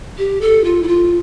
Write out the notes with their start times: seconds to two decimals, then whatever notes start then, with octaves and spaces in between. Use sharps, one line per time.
0.18 G4
0.41 A4
0.64 F4
0.82 E4
0.88 F4